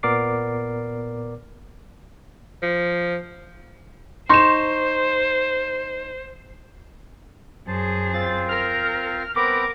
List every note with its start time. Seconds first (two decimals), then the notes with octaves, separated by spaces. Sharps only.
0.03 A#2 B3 A#4 D5 D6 C7
2.62 F3
4.29 D#4 C5 C6 C#6 E7
7.67 F#2 G#4 C5 A5
8.13 C4 F4 C5 A6
8.49 A#4 F6
9.36 B3 C4 A#4 B5 D6